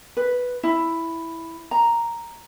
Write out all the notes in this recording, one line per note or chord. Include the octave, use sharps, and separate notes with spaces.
B4
E4
A#5